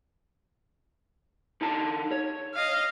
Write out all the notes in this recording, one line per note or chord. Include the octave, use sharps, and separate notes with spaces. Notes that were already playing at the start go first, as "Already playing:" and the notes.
D3 D#4 A5
C#5
D#5 F5